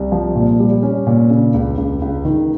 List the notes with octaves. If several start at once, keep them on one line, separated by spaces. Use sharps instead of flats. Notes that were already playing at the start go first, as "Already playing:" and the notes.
Already playing: C2
F3
A#2
G3
C#4
A#2
C#3
C#2
C#2
C#2
D#3